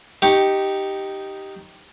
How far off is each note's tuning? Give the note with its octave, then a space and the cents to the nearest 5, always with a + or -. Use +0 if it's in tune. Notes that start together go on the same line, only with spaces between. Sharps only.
D#4 +0 G4 -5 C#6 +0